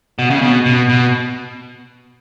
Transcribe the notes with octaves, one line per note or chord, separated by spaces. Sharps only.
B2
C#3
B2
B2
B2